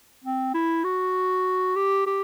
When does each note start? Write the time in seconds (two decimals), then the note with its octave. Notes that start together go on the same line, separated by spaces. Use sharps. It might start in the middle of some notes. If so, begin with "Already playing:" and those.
0.24 C4
0.54 E4
0.84 F#4
1.76 G4
2.07 G4